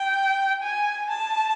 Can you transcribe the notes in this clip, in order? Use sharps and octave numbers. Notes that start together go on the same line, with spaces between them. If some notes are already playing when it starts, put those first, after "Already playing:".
Already playing: G5
G#5
A5